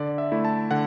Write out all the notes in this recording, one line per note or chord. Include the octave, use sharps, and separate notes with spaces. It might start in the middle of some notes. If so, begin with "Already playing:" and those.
Already playing: D3 D5
E5
A3 E4
A5
D3 F#5